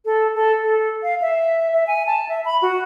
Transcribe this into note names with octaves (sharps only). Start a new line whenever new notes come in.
A4
A4
A4
F5
E5
E5
G#5
A5
E5
B5
F#4